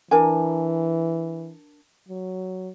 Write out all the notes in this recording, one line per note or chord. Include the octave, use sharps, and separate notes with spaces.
E3 D4 A#4 G#5
F#3